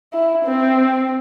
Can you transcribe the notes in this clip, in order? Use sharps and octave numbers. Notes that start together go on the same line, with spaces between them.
E4
C4